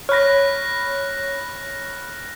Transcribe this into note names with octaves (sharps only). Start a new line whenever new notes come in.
C#5 B5 F6 F#6 A#6